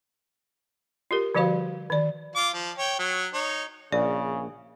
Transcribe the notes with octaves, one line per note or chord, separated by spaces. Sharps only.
F4 G4 A#4
D3 F3 G3 F#4 C5 F5
D#3 D5
F4 D6
F3
C#5 G5
F#3 C#5
D#4 C#5
A#1 C#3 D5